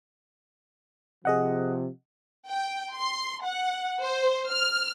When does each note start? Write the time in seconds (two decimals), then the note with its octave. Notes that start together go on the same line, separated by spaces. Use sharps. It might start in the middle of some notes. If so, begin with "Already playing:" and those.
1.25 C3 F3 G#4 D#5 F#5
2.48 G5
2.94 C6
3.44 F#5
4.01 C5
4.51 F6